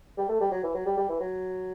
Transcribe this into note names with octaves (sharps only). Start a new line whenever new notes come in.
G3
A3
G3
F#3
E3
F#3
G3
G3
E3
F#3